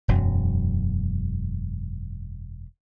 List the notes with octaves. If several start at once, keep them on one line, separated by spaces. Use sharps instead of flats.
E1 F#2 F#3